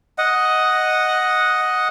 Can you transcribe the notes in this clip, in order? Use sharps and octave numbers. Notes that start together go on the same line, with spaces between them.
D#5 F#5